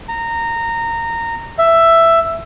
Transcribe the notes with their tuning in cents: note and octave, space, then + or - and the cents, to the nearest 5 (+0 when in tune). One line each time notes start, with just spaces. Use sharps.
A#5 -15
E5 +10